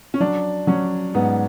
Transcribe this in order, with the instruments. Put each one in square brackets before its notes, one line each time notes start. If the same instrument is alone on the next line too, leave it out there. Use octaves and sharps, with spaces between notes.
[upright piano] C#4
[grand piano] F#3 [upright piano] D4
[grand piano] F#3 [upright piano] C#4
[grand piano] G#2 [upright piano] B3